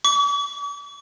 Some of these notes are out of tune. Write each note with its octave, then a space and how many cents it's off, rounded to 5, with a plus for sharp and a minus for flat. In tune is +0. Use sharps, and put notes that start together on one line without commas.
D6 -45